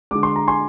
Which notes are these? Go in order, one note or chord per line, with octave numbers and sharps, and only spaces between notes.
D3 G#3 D6
C6
A#5
G#5 C6